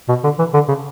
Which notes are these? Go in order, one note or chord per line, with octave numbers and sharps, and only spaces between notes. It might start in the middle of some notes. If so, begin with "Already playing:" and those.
B2
D3
E3
D3
C#3